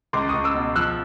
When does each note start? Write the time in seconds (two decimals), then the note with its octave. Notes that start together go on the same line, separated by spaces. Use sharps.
0.13 C#2 C6 D6
0.29 C#2 C#6 D#6
0.44 D6 E6
0.55 B2
0.76 F3 E6 F#6